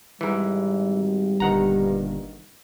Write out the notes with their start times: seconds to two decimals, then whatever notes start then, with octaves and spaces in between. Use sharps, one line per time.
0.21 G#1 G#2 E3 G3
1.40 G1 G2 A#2 D#3 F#5 A#5